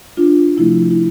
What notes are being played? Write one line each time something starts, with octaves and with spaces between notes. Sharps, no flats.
D4 F4
C3 F3 A3 E4
E4